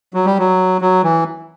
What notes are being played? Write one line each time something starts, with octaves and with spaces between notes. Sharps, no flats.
F#3
G3
F#3
F#3
E3